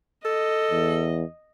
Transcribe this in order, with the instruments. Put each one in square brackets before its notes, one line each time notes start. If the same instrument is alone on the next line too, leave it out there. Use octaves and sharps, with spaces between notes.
[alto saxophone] A4 [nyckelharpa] D#5
[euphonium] E2